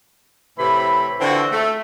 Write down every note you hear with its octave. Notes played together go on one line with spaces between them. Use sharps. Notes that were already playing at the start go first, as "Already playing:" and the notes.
A2 C3 E3 B5
D3 E3 C4 F4 F#4
A3